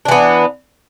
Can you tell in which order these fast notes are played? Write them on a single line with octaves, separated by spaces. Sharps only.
D4 E3 B3